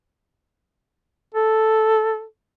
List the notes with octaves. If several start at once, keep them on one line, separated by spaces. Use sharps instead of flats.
A4